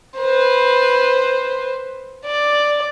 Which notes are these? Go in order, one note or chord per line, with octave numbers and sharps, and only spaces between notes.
B4 C5
D5